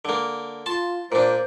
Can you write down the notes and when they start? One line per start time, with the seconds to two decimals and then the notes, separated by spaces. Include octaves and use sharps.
0.05 D3 A#3
0.66 F4 A5 C6
1.12 A#2 D4 C5